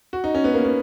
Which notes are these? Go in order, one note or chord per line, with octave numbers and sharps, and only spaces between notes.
F#4
D#4
C#4
B3
A#3
B3